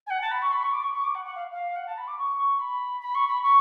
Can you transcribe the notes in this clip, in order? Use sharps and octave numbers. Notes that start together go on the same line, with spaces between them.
G#5
F#5
A5
B5
C#6
B5
C#6
D6
C#6
C#6
D6
F#5
F#5
F5
F5
F#5
A5
B5
D6
C#6
B5
B5
C#6
B5
C#6